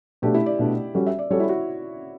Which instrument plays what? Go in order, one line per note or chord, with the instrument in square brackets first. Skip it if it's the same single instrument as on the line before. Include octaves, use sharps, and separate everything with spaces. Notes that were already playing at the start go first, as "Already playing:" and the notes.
[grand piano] B2 A3 D4 [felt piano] G4
[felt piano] E4
D5
[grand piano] B2 A3 D4
G3 C#4 F#4 A4
[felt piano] E5
D5
[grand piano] G3 C#4 F#4 A4 [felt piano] C#5
[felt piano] E4
F#4